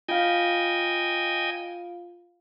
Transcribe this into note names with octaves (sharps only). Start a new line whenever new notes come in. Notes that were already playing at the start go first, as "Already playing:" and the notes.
F4 D#5 F5 G5 G#5